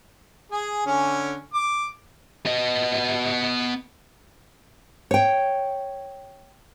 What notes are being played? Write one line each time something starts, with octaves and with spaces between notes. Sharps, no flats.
G#4 G#5
D3 C#4 G#5
D6
B3 D#5
C#5 G5